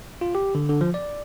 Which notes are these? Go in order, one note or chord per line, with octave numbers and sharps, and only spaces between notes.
F4
G4
D3
D3
F3
D5